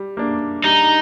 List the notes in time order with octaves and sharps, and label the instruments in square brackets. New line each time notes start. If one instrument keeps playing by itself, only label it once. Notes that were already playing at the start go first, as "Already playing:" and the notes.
Already playing: [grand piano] G3
A#3 D4
[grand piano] G3 [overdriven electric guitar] D#4